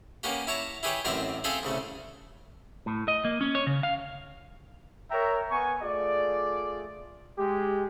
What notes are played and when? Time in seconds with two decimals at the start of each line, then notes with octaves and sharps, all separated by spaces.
0.23 A#3 B3 C#4 F#4 G4
0.47 E4 C#5 A5 A#5
0.83 E4 G4 G#4 B4 C#5 G5
1.05 A1 F#2 C4 E4 A#4 D5
1.44 C4 G#4 A4 E5 F5 C6
1.63 C2 C#3 A3
2.86 A2
3.08 D#5
3.25 A#3
3.41 C#4
3.55 C#5
3.67 C#3
3.83 F5
5.11 A#4 C#5 E5 G5 A#5
5.51 B3 G#5 C#6
5.83 A3 F4 G#4 D5
7.38 G#3 G4